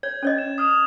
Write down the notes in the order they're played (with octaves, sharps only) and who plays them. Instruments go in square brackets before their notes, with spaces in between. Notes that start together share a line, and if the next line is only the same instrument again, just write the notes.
[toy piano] C#5 [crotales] G#6
[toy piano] C#4 C#5 D#5
[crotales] E7
D#6 F6 E7